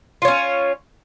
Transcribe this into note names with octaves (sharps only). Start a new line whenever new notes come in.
C#4 F4 C#5